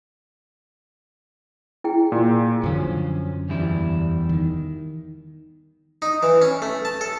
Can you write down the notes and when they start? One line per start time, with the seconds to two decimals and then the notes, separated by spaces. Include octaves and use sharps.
1.84 E4 G#4 G5
2.12 A#2 D5
2.64 F#2 D3 F3 F#3 C#4
3.49 E2 G3 E4
4.29 D#3
6.02 D#4
6.23 E3
6.42 C#4
6.62 A3
6.85 A5
7.01 A4